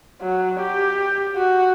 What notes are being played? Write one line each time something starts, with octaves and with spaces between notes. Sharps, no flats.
F#3
G4
F#4